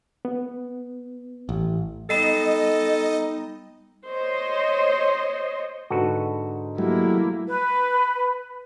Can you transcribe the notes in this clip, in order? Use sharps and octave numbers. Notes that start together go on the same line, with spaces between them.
B3
A1
G3 B3 D#4 A4 D#5
C5 C#5 D#5 C6
G#2 D3 F#4 A4 B4
F#3 G3 A3 A#3 E4
B4